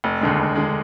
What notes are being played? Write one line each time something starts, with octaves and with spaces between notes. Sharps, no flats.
F1
D#2 D3 G#3
F1
D3 G#3